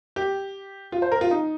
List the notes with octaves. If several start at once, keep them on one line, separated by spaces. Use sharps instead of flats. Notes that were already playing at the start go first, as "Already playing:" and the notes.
G4
F4
C5
A#4
F4
D#4